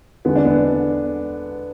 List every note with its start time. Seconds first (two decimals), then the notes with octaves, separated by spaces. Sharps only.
0.25 E2 D3 B3
0.36 D4
0.45 B3